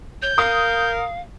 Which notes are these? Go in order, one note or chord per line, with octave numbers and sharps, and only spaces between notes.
C#5 G6
A#4 F5 D#6